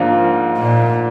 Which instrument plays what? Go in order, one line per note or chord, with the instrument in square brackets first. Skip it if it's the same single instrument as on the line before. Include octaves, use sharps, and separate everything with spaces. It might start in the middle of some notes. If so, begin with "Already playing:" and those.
Already playing: [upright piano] G#2 F3 A#3 D4 F4
[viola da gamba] A#2